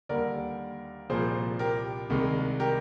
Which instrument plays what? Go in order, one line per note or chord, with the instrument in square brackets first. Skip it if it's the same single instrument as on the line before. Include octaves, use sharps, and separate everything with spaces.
[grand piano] D#2 D3 G3 A#4 D5
C2 A#2 F3 A#3 G#4 C5
G4 A#4
C2 C3 D#3 G#3
G4 A#4